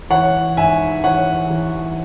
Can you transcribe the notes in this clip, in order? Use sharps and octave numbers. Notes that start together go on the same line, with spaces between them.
E3 C#5 F#5
G#2 E5 G#5
E3 C#5 F#5
E3